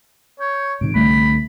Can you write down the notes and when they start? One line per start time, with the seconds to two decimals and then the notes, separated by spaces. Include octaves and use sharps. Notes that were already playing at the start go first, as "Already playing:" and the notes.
0.40 C#5 G6
0.81 G#2 C3 D#3 D7
0.95 C2 D3 G3 A3 B5